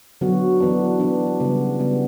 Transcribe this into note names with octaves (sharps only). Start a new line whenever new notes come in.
D3 F#3 B3 F#4
E3 B3 D4
E3 B3 D4
C#3 G3 B3
C#3 G3 B3